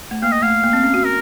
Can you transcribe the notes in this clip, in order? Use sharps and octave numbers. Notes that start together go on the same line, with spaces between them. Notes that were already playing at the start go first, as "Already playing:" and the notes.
A3
A#3 F5
D#5
A3 F5
A#3
C4
C#4
F#4
A#4